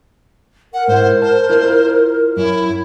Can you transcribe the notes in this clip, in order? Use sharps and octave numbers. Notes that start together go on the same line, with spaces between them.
A#4 F#5
G#2 E4 C5
C5 A5
E4 F4 D5
F#2 E4 C#5